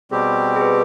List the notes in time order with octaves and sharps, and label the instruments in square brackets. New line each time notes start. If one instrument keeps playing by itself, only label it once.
[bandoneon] B2 G3 C4 G4 [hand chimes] G#4
[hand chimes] G#4
B4